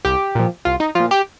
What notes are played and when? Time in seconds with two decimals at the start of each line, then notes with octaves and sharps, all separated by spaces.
0.05 C2 G4
0.35 A#2 F3
0.65 C2 F4
0.80 D#4
0.95 A#2 F3 F4
1.11 G4